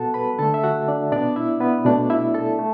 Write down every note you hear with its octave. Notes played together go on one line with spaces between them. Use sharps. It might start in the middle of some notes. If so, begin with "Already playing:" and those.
Already playing: B2 B3 F#4 A4 F#5 A5
B4 B5
D3 A3 A4 A5
E5
F#4 F#5
D4 D5
B2 B3 D4 D5
E4 E5
B3 B4
B2 A3 D4 D5
E4 E5
A4 A5
A3